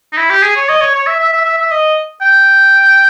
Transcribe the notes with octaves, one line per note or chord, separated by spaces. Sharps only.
D#4
E4
G4
G#4
C#5
D#5
C#5
C#5
E5
E5
E5
E5
E5
D#5
G5